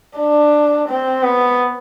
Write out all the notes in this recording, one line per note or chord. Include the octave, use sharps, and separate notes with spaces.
D4
C4
B3